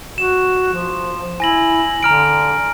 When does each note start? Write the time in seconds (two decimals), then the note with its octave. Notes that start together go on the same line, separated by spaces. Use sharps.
0.18 F#4 E7
0.73 F3
1.40 E4 G#5 A#6 F#7
2.03 D3 A#5 F6 D7